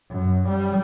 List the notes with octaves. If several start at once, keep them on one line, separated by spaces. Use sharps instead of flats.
F#2
G3